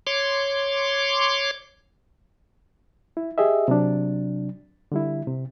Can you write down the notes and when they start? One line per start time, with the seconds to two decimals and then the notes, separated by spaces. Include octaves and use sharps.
0.07 C#5 C6 D6
3.17 E4
3.38 G4 G#4 D#5 E5
3.68 C3 F#3 D4
4.92 D3 G3 E4
5.27 C3